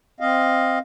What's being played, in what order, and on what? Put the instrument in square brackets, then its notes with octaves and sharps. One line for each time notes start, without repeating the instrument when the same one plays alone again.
[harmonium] C4 D#5 F5